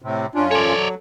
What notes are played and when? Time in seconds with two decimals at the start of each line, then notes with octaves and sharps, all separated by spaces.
0.02 A2 C3
0.35 F#2 C#4 D4 F4
0.51 A4 C#5 D5
0.75 F#3